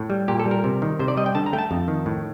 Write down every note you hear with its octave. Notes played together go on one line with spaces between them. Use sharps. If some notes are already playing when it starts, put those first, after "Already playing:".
Already playing: A2
G3
A#2 G4
A4
G3
A#4
C3
D#3
C3 C5
D5
G3 D#5
G5
D3 A5
A#5
A3 G5
A5
F2
D#3
A2